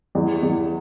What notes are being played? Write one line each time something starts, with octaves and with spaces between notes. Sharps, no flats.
E2
E2